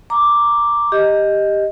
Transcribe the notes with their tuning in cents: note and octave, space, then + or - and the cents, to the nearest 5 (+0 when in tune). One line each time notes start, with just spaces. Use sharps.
A#5 +0 D6 +0
G4 +10 D#5 +0